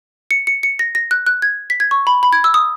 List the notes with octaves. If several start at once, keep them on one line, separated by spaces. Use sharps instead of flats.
C#7
C#7
C#7
A#6
A#6
F#6
F#6
G#6
B6
G#6
C#6
B5
B5
G#6
E6
D#6